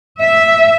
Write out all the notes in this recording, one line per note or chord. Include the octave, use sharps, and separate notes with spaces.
E5